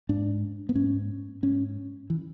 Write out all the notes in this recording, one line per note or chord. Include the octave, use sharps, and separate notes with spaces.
G#2 D4
B3
G#2 C#4
G#2 C#4
E3